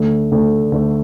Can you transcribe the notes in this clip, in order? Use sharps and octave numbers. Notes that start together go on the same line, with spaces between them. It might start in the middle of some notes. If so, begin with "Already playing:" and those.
Already playing: D2 D3 A3
D2 D3 A3
D2 D3 A3